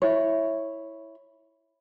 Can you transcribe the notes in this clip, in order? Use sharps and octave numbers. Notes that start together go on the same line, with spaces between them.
E4 C#5